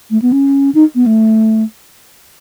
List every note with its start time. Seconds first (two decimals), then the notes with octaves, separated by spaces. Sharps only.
0.11 A3
0.22 B3
0.32 C#4
0.75 D#4
0.95 B3
1.06 A3